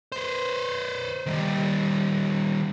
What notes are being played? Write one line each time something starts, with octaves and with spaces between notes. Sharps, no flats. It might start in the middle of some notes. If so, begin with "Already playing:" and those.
B4 C5
D#3 G3